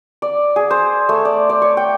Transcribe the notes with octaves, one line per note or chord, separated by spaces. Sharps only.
D5
G#4
C5
A3
D5
D5
C#5
G5